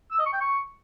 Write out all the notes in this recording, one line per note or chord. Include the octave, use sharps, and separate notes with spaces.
E6
D#5
C#6
G5
C#6